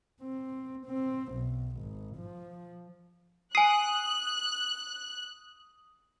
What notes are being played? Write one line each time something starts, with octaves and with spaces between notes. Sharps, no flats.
C4
C4
B1
G#1
F3
G#5 D#6 F#6 C7